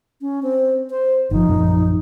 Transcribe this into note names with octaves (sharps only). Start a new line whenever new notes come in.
C#4
C4
C5
G1 F3 D#4
A#1 F#2 F3